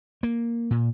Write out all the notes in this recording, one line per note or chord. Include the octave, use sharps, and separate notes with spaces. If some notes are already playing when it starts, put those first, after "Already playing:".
A#3
A#2